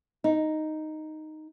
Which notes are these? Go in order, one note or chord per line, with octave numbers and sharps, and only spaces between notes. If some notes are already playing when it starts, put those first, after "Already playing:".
D#4